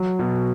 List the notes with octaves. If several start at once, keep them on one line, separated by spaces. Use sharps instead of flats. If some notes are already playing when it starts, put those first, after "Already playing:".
Already playing: F#3
B2